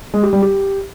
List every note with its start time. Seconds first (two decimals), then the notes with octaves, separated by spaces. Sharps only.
0.14 G#3
0.23 G4
0.33 G3
0.42 G4